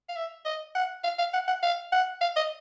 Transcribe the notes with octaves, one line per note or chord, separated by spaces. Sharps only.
F5
E5
D#5
F#5
F5
F5
F#5
F#5
F5
F#5
F5
D#5